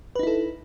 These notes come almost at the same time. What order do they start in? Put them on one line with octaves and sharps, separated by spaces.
B4 D#4 E4 A4